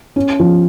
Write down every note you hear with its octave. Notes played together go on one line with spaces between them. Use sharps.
C#4
F3